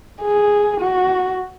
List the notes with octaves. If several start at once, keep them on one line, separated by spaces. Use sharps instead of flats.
G#4
F#4